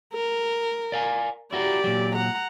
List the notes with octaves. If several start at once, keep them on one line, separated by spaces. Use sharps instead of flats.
A#4
D5 F5 G#5
E4 F#4 G4 A#4 D5
A#2 F#3
F#5 A#5